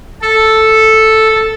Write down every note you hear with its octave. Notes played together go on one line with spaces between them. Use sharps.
A4